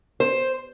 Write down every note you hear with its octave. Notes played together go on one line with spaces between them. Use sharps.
C5